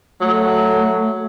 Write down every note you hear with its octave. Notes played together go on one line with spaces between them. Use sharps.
F#3 A3